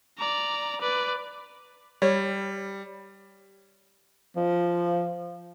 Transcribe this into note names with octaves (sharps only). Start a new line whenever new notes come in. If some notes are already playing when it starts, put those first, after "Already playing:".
D5 A#5
B4 D5
G3 C#5
F3